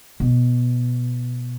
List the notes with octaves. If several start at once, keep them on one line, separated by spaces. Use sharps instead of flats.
B2